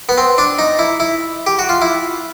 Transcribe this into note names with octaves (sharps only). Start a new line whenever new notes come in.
B3
C4
D4
D#4
E4
E4
G4
F#4
F4
E4